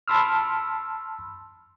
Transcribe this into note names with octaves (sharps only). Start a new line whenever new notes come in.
A5 B5 C6 E6 F6